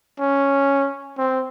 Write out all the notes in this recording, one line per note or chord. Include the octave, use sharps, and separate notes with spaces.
C#4
C4